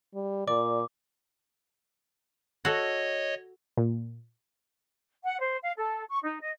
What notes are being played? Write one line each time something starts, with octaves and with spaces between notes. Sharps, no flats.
G3
A#2 D5 D6
F#4 A4 C#5 D#5
A#2
F#5
C5
F5
A4
C#6
D#4
D#5